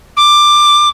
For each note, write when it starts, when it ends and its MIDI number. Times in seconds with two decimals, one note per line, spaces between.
0.16 0.88 86